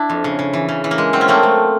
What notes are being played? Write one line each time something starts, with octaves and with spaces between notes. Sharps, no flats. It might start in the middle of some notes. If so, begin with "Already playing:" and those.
Already playing: D4 E4
F2
C#3
C#3
E3
C#3
E3
A#3
G#3
F#3 C4
C#4
A3 A#3 C4
A3